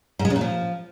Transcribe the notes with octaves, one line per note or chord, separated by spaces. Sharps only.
G#2
G#3
C#3
A#2
F3